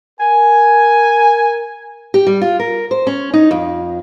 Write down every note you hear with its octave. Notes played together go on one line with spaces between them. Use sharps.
A#4 G#5
G4
G3
F4
A#4
C5
C#4
D#4
F2